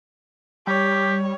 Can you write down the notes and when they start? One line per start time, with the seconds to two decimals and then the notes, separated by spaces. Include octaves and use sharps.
0.67 G3 G4 C#5